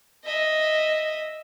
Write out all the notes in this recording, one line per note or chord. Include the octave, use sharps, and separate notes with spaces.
D#5 E5